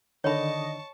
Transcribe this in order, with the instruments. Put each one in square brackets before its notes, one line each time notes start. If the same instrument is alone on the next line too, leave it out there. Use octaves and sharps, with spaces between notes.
[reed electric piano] D3 D#3 D4 [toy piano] C#5 B5 [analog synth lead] D#5 [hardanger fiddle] A5 C#6